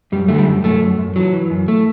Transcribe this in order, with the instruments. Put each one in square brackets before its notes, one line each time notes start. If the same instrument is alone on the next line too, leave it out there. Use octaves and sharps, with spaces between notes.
[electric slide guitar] F#2 G3
D3 A3
G3
F#2
F#2 A3
F#2
F#2
E3 F#3
E3
F#2
A3